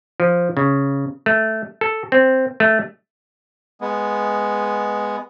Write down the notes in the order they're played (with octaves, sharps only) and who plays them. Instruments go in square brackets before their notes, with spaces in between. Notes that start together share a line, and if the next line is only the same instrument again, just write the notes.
[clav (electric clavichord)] F3
C#3
A3
A4
C4
A3
[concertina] G#3 B3